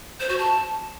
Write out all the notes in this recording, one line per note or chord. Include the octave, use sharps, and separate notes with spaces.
C5
F#4
A5